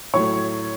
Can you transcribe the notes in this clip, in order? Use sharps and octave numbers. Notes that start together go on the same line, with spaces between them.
A2 F#3 A3 C#5 C#6